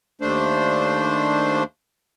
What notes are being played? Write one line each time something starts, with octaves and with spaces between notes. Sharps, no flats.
D#2 A3 D4 C5